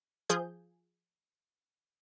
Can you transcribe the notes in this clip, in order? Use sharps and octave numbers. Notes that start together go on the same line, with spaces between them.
F3 G#4 G6